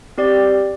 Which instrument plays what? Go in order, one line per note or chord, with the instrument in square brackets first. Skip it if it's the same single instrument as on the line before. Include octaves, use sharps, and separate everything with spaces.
[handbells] C4 G4 D5